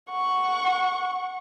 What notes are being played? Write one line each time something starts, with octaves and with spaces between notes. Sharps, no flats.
F#5 C#6